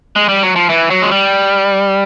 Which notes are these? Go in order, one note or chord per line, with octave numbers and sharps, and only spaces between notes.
G#3
G3
F#3
F3
E3
F#3
G#3
G3